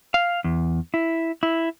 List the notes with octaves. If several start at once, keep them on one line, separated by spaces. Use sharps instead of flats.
F5
E2
E4
E4